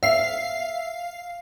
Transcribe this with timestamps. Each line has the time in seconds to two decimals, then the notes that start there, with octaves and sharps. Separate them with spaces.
0.03 E5 F5 C7